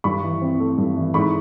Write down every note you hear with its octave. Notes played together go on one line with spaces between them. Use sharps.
G2 B5 C#6
E3
C4
A3
G2
E3
G#2 B5 C#6